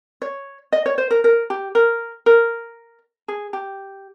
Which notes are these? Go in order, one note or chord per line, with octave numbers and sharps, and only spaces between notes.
C#5
D#5
C#5
C5
A#4
A#4
G4
A#4
A#4
G#4
G4